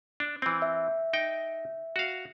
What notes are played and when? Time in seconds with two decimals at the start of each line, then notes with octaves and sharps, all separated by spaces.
0.20 D4
0.42 E3 C4
0.62 E5
1.13 D#4 G5
1.96 F#4 F5